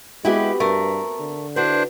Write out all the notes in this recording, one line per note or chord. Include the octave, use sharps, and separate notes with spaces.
G#3 B3 C4 E4 F#4 G4
G2 A3 A#4
D3
D4 E4 F#4 B4 C5